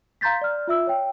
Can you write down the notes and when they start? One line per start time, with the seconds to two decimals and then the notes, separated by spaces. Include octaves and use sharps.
0.21 F5 A#5 C6 G6 A6 B6
0.41 D5 F6
0.68 F4 E5 E6
0.87 C#5 G5